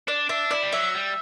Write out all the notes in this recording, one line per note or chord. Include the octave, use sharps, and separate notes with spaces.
D4 D5
D4 E5
E4 D5
G3
F#3 E5
G3